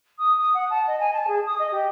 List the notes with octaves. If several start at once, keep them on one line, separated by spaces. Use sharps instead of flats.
D#6
D#6
F#5
A5
D#5
G#5
A5
G#4
D#6
D#5
G4